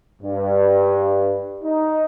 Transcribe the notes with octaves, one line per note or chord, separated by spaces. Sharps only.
G2
D#4